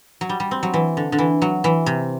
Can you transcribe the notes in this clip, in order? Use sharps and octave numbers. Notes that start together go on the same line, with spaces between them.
F#3
G3
G3
C4
F#3
E3
D3
D3
E3
F#3
E3
C3